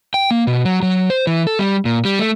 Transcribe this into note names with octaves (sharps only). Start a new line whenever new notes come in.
G5
A#3
B2
F#3
F#3
C5
E3
A4
G3
A#2
G3
A3